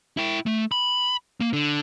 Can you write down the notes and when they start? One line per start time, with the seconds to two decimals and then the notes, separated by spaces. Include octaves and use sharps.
0.17 E4 G5
0.46 A3
0.72 B5
1.41 A#3
1.53 D3